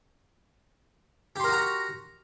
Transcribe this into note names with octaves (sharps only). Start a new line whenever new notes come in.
F#4 G4 A#4 A#5 C6